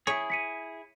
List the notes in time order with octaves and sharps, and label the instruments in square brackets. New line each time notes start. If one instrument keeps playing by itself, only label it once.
[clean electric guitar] E4 G#4 [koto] C#5
[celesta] B6 C#7 D#7